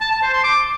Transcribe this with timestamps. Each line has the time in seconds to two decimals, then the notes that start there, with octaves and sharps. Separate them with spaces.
0.01 A5
0.12 A5
0.23 C5
0.33 C6
0.44 D6